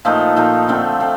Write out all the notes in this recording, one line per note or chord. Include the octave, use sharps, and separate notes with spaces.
A#2 F3 A3 D#4
A#2 F3 A3 D#4
D3 A3 C4
A3 C4